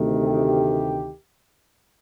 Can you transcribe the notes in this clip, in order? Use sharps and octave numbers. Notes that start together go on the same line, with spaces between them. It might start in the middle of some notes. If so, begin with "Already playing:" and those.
Already playing: D2 C3 D#3 A3
G4